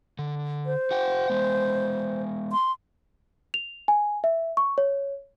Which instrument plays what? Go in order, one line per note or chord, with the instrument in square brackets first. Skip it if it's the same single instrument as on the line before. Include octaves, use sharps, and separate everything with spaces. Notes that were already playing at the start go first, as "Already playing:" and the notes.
[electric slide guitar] D3
[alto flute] C5
[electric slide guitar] F#4 F#5 G5
G#3 B3
[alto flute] C6
[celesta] F7
G#5
E5
C#6
C#5